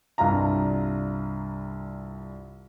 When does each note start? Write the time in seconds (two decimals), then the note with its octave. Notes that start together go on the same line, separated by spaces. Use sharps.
0.18 C2 G2 D4 F4 A#5